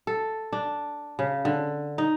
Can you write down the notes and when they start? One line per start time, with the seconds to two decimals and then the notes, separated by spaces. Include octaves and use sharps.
0.07 A4
0.53 D4
1.19 C#3
1.45 D3
1.98 D#4